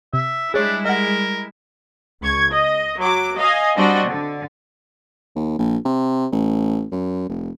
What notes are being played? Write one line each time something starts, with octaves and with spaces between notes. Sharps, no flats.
C3 E5
G3 G#3 D4 E4 G#4 C#5
A#4 D#5 F#5
C#2 C#6 G#6
D#5
F#3 D6
D#5 F5 G#5
G3 C4 D4 F#4 D#5
D3
D#2
A#1
C3
A1
F#2
F1